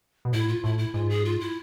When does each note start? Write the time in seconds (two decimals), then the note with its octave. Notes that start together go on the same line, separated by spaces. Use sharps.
0.25 B2
0.33 A2 E4
0.48 F4
0.64 A2 E4
0.78 E4
0.94 G#2 F4
1.10 G#4
1.25 F4
1.40 E4